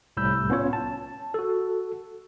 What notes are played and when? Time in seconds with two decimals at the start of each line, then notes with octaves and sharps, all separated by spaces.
0.17 C2 A2 B5 E6 G6
0.50 B3 C#4 F4 C#5
0.73 A5
1.34 F#4 A4